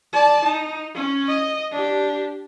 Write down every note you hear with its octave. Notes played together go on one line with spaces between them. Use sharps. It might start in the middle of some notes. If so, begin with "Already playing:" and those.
D5 A5
D#4
C#4
D#5
D4 G4